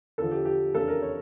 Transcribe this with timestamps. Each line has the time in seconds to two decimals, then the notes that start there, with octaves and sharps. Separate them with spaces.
0.18 E2 D3 F3 A4
0.31 G4
0.45 G4
0.74 F2 C#3 E3 A#3 D4 A4
0.88 A#4
1.02 C#5